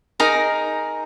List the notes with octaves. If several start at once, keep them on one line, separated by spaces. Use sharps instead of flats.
D#4 G#4 A#4